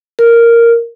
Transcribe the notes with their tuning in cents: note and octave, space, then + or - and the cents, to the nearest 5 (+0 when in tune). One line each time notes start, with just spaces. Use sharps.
A#4 -5